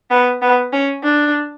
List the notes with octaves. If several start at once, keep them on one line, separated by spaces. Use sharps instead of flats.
B3
B3
C#4
D4